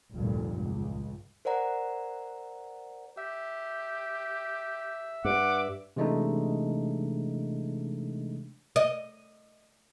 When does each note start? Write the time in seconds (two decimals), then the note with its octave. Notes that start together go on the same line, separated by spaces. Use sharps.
0.15 F1 D2 G2 A#2
0.57 C#2
1.45 A#4 C5 D5 F#5 A#5
3.17 G4 E5
5.25 G2 F#5 D6
5.96 C3 E3 G#3 A3 D4 D#4
8.76 D#5